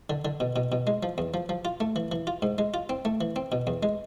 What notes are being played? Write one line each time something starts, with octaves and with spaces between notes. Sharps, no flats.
D3
D3
B2
B2
B2
G#3
F3
E2
F3
F3
F4
A3
E3
E3
F4
G#2
G#3
F4
C4
A3
E3
C4
B2
E2
G#3